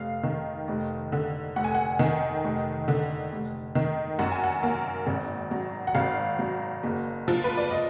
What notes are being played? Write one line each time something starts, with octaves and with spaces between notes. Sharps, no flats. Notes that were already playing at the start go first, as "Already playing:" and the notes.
Already playing: F1 F5
D#3
F1
D3
F1 F#5
G#5
F#5
D#3
F1
D3
F1
D#3
F#2 F#5
G#5
F#5
A#3
G#1
F#3
F#5
G#1 F5
F#3
F#1
F3
B4
D5
D#5